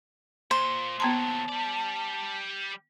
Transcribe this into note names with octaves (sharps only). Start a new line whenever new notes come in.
A#2 C5
D#2 F#3 B3 A5 A#5 C6
G3 D5